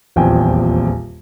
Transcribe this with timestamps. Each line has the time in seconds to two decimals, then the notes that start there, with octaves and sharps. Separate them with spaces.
0.16 D#1 A#1 E2 C4 G5 G#5